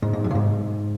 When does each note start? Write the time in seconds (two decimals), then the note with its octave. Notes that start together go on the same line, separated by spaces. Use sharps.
0.02 G#2
0.13 G#2
0.24 F#2
0.31 A#2
0.35 G#2